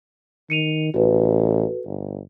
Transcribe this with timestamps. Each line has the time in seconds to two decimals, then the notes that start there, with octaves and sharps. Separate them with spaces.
0.50 D#3 C#7 D#7 F7
0.94 A1 F#4 A4 B4
1.86 G1